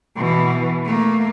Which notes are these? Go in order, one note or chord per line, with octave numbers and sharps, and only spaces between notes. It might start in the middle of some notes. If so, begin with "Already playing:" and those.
B2 E3
A3 A#3